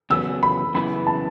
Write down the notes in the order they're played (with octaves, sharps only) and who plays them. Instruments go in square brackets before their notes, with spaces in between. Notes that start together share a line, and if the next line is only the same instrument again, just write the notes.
[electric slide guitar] E2 C#3 F#3 B3 [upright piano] E6
[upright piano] B5
[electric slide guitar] F#2 C#3 E3 B3 [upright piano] B5
[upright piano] A5